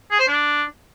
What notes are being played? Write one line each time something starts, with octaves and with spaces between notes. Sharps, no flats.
G#4
C5
D4